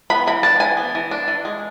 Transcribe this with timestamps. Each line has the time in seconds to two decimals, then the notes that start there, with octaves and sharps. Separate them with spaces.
0.10 B3 B5
0.27 E3 B5
0.43 D4 A5
0.60 E3 G#5
0.77 B3
0.95 E3
1.11 D4
1.28 E3
1.45 G#3